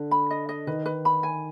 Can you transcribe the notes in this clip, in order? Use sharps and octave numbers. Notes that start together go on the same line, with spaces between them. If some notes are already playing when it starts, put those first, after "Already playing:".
Already playing: D3
B5
D#5
D#5
D#3 B4
B4
B5
G#5